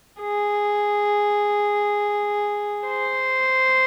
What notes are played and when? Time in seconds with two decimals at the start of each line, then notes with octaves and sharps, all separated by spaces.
0.21 G#4
2.88 C5